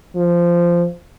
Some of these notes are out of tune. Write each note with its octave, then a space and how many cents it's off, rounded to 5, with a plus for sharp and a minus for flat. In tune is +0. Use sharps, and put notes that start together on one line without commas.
F3 -15